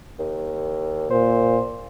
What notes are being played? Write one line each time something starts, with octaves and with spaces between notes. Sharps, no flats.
D#2
A#2 C5